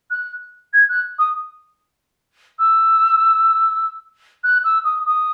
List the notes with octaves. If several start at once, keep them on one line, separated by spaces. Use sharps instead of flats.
F#6
G#6
F#6
D#6
E6
F#6
E6
D#6
D#6